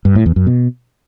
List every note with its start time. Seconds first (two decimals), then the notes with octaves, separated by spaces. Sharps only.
0.05 G2
0.15 A2
0.26 E2
0.36 F#2
0.47 B2